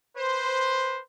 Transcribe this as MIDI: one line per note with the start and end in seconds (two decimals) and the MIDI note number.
0.16 0.99 71
0.16 0.99 72